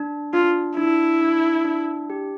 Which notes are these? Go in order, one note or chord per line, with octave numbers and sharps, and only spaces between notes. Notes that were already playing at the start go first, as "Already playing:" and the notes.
Already playing: D4
D4 F4
D4 E4
D4
D4
G4